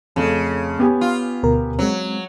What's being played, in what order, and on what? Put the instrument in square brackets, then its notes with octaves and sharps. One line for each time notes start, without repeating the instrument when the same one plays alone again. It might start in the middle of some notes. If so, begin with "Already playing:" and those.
[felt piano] F2 A3 [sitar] C#3
[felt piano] B3 G4 G#5
[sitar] F4
[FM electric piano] D2 B2 A#4
[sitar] F#3 [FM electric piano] G#3 C4